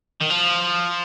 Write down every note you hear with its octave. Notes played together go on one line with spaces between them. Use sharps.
D#3
F3